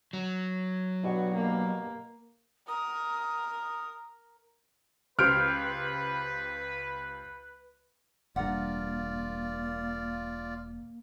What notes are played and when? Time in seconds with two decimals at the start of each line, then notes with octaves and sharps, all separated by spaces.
0.13 F#3
1.04 G2 B2 F#4
1.36 A#3
2.68 A#4 D#6
5.19 C#2 G4 B4 C5 F6 D7
8.36 E1 G2 A#3 F4 A#4 D5 F#5